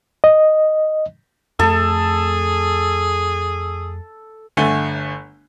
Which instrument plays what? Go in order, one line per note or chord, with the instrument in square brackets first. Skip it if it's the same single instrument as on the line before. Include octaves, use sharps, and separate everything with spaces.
[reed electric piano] D#5
[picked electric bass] F2 A3 [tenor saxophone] G#4 [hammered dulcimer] A4
[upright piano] G1 D3 A3 G#5 G7